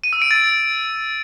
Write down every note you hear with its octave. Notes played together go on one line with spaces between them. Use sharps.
D#7
E6
D7
A6